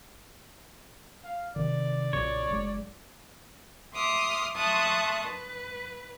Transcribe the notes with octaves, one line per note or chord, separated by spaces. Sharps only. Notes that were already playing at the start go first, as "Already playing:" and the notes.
F5
C3 D#3 D5
B1 A#2 C#3 C#5
F#1 G#3
E5 C6 D6 D#6 F6
E5 A5 C6 C#6 D#6 F#6
B4